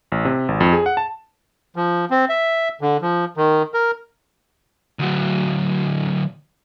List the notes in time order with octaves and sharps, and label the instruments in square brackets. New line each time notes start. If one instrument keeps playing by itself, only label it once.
[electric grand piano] A1
C3
G#1
F2
G#4
F#5
A5
[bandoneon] F3
C4
E5
D3
F3
D#3
A#4
[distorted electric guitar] D2 F#3